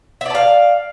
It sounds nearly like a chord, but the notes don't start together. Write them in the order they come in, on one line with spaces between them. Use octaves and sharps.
E5 D5 A5 F5